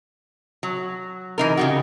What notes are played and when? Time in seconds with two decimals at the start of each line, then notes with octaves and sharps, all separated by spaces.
0.63 F#3
1.38 E3 D#4 A#4
1.57 C#3 G3 F#4